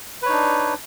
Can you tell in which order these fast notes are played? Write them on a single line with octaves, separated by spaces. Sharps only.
B4 C#5 D#4 D4